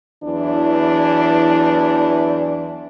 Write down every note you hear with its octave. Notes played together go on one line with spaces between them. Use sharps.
E2 E3 F#3 D4 E4